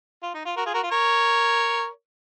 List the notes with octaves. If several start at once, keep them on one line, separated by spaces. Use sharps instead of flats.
F4
D#4
F4
F#4 A#4
F4 G#4
F#4 A#4
F4
A#4 C#5